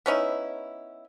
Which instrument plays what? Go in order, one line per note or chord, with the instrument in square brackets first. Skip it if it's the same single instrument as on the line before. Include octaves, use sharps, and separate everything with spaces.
[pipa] B3 C#4 D#4 E4